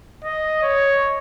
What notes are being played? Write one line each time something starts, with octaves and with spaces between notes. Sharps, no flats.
D#5
C#5